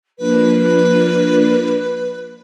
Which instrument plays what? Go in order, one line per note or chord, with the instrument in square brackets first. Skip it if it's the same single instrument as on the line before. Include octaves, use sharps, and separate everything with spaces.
[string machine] F3 A#3 D4 [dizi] B4